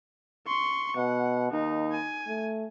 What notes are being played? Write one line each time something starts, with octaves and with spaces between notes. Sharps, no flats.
C6 C#6
B2 F#5
D#2 D#4
G#5
A3